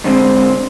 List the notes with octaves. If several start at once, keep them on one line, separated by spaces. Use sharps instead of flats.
F2 D3 G#3 C4